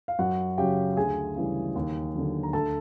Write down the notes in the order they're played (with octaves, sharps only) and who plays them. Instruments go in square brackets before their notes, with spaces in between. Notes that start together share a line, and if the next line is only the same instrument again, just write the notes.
[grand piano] F5
F#2 F#4 F#5
C#3 F#3 G4 G5
D2 G#4 G#5
C#3 E3 G3
D#2
D3 F#3
A#5
D2 A4 A5